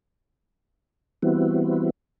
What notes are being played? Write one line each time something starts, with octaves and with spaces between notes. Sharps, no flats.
E3 G3 B3 C4 E4 F#4